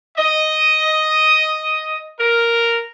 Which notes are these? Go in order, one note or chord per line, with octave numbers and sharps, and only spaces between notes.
D#5
A#4